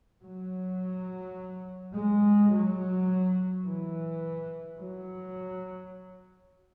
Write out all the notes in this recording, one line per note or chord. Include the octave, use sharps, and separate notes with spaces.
F#3
G#3
F#3
E3
F#3